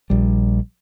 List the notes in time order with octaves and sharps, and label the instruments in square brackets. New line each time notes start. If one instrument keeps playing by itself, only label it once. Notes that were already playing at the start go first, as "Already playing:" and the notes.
[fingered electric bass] A#1 G3